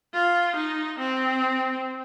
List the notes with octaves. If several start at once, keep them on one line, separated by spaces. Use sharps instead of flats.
F4
D#4
C4